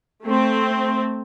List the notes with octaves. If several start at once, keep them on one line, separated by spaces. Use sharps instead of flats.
A3 C4